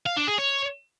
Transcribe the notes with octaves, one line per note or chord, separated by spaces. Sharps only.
F5
D4
G#4
C#5